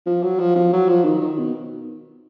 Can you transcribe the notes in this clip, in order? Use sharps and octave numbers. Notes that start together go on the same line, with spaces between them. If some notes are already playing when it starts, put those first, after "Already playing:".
F3
F#3
F3
F3
F#3
F3
D#3
D#3
B2